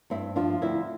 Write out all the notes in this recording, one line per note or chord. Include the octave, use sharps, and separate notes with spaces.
G2 C4 E4
F3 D4 F4
D2 C4 E4